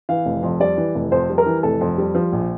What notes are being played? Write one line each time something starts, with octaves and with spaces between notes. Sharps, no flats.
E3 F5
F1
F2
G3 D5
E3
F1
F2 C5
G3
A#4
E3
F1 A4
F2
G3
F3
A#1